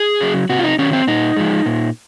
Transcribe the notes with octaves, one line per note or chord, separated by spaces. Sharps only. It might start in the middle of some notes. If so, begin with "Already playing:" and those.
Already playing: G#4
C#3 F#3
C3 F#4
F4
D#4
D#3 F#3 C#4
C4
A#2 D#4
F3 G#3
A#2